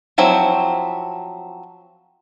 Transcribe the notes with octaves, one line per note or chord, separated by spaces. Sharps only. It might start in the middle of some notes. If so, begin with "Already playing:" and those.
F3 F#3 C4 E4